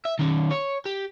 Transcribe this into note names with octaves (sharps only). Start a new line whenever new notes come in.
E5
D#3 C#4
C#5
G4